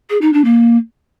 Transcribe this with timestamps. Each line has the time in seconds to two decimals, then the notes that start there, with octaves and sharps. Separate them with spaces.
0.10 G#4
0.21 D#4
0.33 D4
0.44 A#3